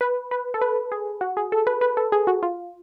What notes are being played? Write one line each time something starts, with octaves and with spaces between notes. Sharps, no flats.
B4
B4
A4
B4
G#4
F#4
G#4
A4
B4
B4
A4
G#4
F#4
F4